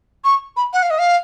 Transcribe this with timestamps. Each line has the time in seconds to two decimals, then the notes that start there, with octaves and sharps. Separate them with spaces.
0.24 C#6
0.57 B5
0.73 F#5
0.83 F5
0.90 D#5
0.99 F5